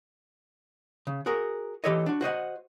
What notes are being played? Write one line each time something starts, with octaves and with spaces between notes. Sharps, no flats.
C#3
F#4 G#4 A#4
E3 A#3 G4 A4 C#5 D#5
D4 F#4
F#4 C5 D#5 F#5